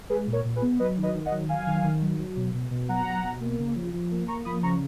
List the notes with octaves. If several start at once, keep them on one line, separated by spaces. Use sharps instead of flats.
G#3 G#4 B4
A#2
A#4 C#5
A#2
G#4 B4
B3
F#3 B4 D#5
D#3
B4 D#5
D#3
D#5 F#5
F#3
F#3 F5 G#5
D#3
D#3
F#3
F#3
B2
B2
B2
F#3 F#5 A#5
B2
B2
A#3
C#3
F3
F3
A#3
A#3 A#5 C#6
F3 B5 D#6
C#3 A#5 C#6